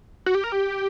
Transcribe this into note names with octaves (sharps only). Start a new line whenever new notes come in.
F#4
G4
A#4
G4